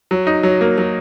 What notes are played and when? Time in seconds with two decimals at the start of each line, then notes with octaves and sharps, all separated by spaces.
0.11 F#3
0.27 D#4
0.43 F#3
0.61 A#3
0.78 F#3